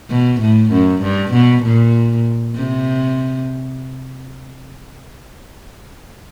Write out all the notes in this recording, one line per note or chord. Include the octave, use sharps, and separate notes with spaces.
B2
A2
F#2
G2
B2
A#2
C3